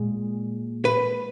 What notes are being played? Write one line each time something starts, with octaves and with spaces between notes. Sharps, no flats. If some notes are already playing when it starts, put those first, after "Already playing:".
Already playing: A#2 G#3
B4